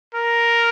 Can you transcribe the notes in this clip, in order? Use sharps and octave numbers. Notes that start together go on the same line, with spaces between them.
A#4